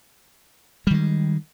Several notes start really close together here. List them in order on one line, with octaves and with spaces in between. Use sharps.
G3 D#3 G#3